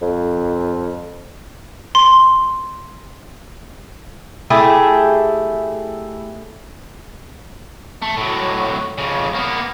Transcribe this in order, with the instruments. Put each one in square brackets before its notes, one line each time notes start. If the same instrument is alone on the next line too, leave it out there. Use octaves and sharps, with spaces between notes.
[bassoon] F2
[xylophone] C6
[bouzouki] A3 E4 G4 G#4
[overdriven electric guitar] A3
A2 F#3
F2 C#3
A#3 B3